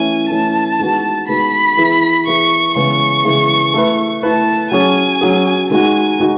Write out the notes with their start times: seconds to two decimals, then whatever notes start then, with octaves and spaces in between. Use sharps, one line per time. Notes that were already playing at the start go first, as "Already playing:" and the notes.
Already playing: E3 A3 C#4 E4 G#5
0.30 E3 A3 C#4 E4 A5
0.79 D#3 G#3 B3 F#4
1.28 D#3 G#3 B3 F#4 B5
1.77 E3 B3 E4 G#4 B4
2.26 E3 B3 E4 G#4 B4 C#6
2.75 C#3 E3 G#3 B3 E4 C#6
3.25 C#3 E3 G#3 B3 E4
3.74 A3 E4 B4
4.23 A3 E4 B4 A5
4.72 F#3 C#4 G#4 G#5
5.21 F#3 C#4 G#4
5.70 D#3 G#3 D#4 F#4 G#5
6.19 D#3 G#3 D#4 F#4